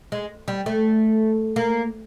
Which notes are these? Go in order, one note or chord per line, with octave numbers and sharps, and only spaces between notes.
G#3
G3
A3
A#3